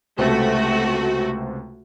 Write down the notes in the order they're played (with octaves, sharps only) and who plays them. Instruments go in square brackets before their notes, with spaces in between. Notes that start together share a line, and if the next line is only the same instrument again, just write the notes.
[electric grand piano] C#2 C3 C5 [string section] A3 F#4